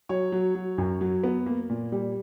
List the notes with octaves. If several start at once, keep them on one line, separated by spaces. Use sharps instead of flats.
F#3 C#5
F#3
F#3
F#2
F#3
B3
A#3
A#2
G3